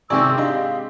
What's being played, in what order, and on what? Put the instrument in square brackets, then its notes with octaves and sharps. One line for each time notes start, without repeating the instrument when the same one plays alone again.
[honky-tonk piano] C3 D#3 D5 [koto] G#3 C4 [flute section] G#4 C#6 E6
[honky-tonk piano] D4 D#5 [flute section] G4 F5